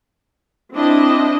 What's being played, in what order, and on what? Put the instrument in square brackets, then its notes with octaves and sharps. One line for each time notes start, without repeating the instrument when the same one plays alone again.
[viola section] C4 D4 E4 D#5